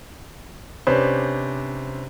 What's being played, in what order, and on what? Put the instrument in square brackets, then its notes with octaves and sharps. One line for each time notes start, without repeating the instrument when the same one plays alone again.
[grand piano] C3 C#4 D4 B4 C5